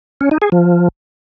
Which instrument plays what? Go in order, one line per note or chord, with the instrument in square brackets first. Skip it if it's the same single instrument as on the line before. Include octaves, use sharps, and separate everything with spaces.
[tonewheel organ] C#4
D#4
G#4
F3